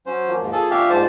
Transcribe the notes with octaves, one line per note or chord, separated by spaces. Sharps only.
F#3 C#4 C5
F3 A#3
D#2 G#2
F4 G#4 A4
C#4 D4 G4 E5 F5
G#2 C5 A5